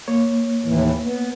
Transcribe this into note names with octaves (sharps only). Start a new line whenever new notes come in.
A#3 C#5
D#2 A2 E3
B3